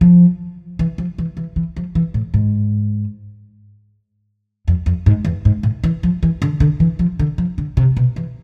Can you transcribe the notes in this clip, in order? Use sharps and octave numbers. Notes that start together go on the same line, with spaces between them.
F3
E3
F3
E3
E3
E3
F3
E3
A2
G#2
F2
F2
G#2
E2
G#2
A2
E3
F3
E3
D3
D3
E3
F3
D3
F3
D3
C3
B2
E3